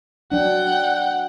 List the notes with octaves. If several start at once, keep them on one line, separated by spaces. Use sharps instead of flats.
F#3 D4 F#5 G5